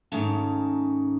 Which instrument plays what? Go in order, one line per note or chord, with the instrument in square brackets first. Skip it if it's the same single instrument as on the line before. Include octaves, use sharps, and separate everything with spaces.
[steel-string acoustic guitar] G#2 D#3 A3 C#4 A5 A#5